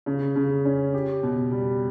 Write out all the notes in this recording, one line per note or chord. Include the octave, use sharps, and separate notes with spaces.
C#3
C#3
C#4
G4
B2
G3